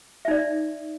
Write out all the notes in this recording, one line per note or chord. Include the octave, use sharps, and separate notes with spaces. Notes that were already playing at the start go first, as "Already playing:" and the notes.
D#4 D5 E5